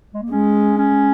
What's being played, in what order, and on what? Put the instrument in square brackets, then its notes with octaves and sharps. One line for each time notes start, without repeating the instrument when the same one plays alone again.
[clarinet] G#3
A#3
[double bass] G#3 [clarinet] C#4
[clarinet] C#4